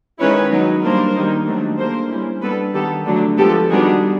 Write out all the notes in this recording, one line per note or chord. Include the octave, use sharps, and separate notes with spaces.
D#3 G#3 C#4 E4 B4 C#5
F#3 B3 D#4
G3 A#3 D4 A#4 C5
D#3 G3 A#3 D#4
D#3 F#3 A3 D4
D3 G3 A#3 A#4 C5
G3 A#3 C#4 E4
G3 B3 D4 A4 B4
D#3 G3 B3 G4 A4
D3 F#3 A3 D4
F3 G#3 B3 G4 A4
D#3 G3 B3 D4 F#4 G#4